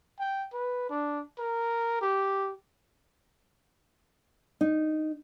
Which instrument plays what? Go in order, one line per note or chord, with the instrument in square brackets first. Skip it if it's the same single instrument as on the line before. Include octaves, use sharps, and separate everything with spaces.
[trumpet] G5
B4
D4
A#4
G4
[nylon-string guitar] D#4